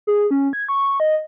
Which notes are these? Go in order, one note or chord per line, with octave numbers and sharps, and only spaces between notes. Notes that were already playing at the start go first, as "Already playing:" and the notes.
G#4
C#4
G#6
C#6
D#5